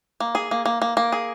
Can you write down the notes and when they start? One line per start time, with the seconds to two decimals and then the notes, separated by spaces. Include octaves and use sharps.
0.20 A#3
0.35 G#4
0.51 A#3
0.65 A#3
0.82 A#3
0.97 A#3
1.12 G#4